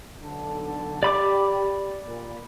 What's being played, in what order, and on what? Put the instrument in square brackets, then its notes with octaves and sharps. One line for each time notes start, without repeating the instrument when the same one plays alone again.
[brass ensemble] B1 D3 A5
[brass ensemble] G4 [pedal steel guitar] D5 B5 D6
[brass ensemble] A#2